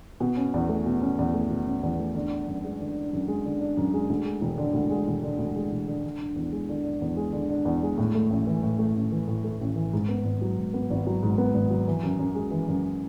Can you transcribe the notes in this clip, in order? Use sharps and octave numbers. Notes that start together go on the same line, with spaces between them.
B2
C#4
E2
A3
B2
C#4
E2
A3
B2
C#4
E2
A3
D3
D4
F#2
G#3
D3
D4
F#2
G#3
D3
D4
F#2
G#3
D2
G#3
E1
D3
D2
G#3
E1
D3
D2
G#3
E1
D3
D3
D4
E2
G#3
D3
D4
E2
G#3
D3
D4
E2
G#3
A2
A3
A1
E3
A2
A3
A1
E3
A2
A3
A1
E3
G#2
B3
G#1
F#3
G#2
B3
G#1
F#3
G#2
B3
G#1
F#3
E3
F#2
F#2
G#3
E3
F#2